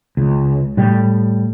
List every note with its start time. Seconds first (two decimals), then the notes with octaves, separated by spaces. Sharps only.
0.17 C#2
0.77 A2 G3